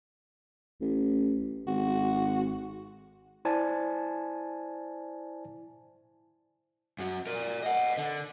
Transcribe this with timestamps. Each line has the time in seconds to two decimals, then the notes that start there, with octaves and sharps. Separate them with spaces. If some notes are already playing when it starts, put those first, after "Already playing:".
0.81 A1
1.67 G#1 F#4
3.45 E4 C5 D5 G#5 A5
6.99 F#2 F#3
7.27 A#4 D5
7.63 D#5 F#5
7.98 D3